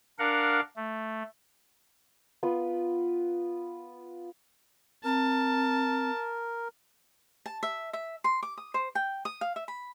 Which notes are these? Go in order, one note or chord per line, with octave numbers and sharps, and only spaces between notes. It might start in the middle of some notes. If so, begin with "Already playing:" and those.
D4 A#4 F5 F#5
A3
B3 F4 B4
C4 A#4 A5
A5
E5
E5
C6
D6
D#6
C5
G5
D#6
F5
E5
B5